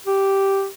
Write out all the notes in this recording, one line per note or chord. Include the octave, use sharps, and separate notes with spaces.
G4